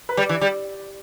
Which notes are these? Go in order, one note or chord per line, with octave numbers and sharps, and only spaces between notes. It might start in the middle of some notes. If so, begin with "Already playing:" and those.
B4
G3 D5
E3
G3